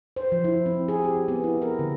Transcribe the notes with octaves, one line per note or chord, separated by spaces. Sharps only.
C5
F3
E4
C4
G#4
G4
B3
E4
A#4
D3